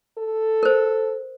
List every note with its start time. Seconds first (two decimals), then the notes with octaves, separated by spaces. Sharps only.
0.18 A4
0.63 A#4 C5